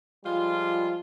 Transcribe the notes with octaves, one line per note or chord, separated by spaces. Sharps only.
F3 G3 G#3 F4